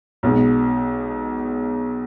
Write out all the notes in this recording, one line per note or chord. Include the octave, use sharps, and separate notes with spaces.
B1 B2 G#3